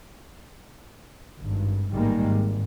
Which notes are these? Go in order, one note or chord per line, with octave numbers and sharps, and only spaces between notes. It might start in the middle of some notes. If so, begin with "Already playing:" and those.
G#1 G2
A1 G#2 D#3 G3 G#3 A#3
G#1